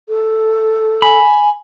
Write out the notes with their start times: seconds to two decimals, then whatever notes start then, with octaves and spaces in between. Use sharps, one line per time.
0.09 A4
1.02 G#5 B5